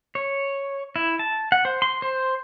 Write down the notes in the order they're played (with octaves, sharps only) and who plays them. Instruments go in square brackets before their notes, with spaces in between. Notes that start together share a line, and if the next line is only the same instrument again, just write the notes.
[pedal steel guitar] C#5
E4
A5
F#5
C5
C6
C5